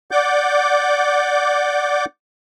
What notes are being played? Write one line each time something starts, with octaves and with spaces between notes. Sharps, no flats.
D5 F#5 D6 G6